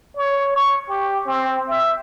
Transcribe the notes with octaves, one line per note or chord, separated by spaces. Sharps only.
C#5
C#6
G4
C4
E5